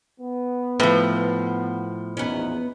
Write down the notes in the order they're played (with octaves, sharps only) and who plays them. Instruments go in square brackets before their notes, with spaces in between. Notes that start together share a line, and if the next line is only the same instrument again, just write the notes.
[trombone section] B3
[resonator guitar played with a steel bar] A2 F3 [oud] B4
[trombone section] A#1 E2 D#4 [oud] B3 C#4